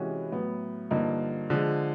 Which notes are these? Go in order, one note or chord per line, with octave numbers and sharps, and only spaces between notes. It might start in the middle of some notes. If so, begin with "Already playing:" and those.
Already playing: C3 E3 G#3 C#4 F#4
A2 F#3 B3
G2 D3 F3 A#3 D#4
D3 F3 G#3